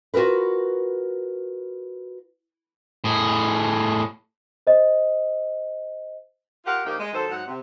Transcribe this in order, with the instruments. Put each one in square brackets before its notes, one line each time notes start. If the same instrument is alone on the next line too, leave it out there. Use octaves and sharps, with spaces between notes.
[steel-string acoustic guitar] F4 F#4 G#4 A#4 B4
[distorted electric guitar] A2 G#4
[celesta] C5 D#5
[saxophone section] F4 G4 A#4 F#5
A#2 F3 A#3 D#4 G4
G#3
D#3 F#3 A4 C5
G#2 F#3 F#5
C3